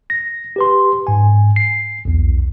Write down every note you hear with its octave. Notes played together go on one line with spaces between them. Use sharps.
A#6
G4 B4 C6
G#2 G#5
C7
B1 E2